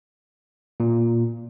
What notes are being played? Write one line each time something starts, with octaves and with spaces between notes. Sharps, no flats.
A#2